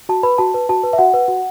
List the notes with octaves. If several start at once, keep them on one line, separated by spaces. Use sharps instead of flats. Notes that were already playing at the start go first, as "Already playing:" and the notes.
F#4 A5
B4 B5
F#4 A5
B4
F#4 A5
B4
E5
F#4 F#5
B4
F#4